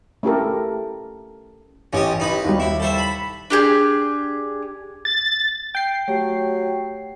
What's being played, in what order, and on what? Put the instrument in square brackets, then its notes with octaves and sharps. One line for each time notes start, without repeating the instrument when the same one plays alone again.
[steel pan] A3 C#4 E4 G4 A4 A#4
[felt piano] A1 [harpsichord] C#4 G4 D#5
[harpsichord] D#4 B4
[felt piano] D#2 G3
[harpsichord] E4
A4 C5 E5
B5
[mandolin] D4 G4 G#4
[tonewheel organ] A6
[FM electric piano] G5 C7
[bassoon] F#3 [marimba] A3 G4